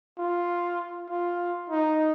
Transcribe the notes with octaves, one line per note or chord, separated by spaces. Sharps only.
F4
F4
D#4